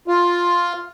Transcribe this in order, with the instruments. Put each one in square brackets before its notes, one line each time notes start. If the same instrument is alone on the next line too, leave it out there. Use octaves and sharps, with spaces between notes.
[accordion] F4